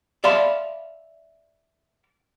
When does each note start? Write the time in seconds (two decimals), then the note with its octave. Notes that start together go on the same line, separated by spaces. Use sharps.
0.24 D5 E5 F5 A5 B5 C6